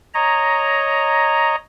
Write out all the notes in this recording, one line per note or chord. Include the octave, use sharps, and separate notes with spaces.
C#5 D#5 A#5